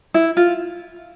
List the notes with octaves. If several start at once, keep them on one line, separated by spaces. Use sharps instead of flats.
E4
F4